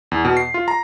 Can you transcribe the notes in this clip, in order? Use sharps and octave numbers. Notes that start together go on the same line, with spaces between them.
E2
B2
C7
F4
A#5